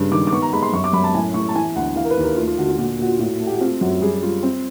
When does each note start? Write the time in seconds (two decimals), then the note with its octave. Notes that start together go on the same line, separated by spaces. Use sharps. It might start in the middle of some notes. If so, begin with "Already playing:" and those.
Already playing: G2 C#3
0.12 D#3 D6
0.27 D6
0.32 B3 C#6
0.42 A#5
0.53 G#3 B5
0.62 C6
0.73 F#2 C#6
0.84 D6
0.93 F#2 B5
1.04 A5
1.14 A2 G#5
1.34 A2 C#6
1.49 A5
1.55 E3 G#5
1.76 D2 F#5
1.96 E3 F5
2.05 A#4
2.10 B4
2.17 D#2
2.24 A#4
2.37 A3 F4
2.47 F4
2.58 D3 F#4
2.69 F4
2.78 A#2 F#4
2.99 A#2 F#4
3.06 F4
3.19 A2 F#4
3.40 A3
3.47 G4
3.54 F#4
3.60 C4 F4
3.81 F#2 F#4
4.01 G3 G#4
4.22 G3 F4
4.43 C4